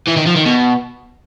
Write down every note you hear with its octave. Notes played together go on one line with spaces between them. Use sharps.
E3
D#3
F3
D#3
B2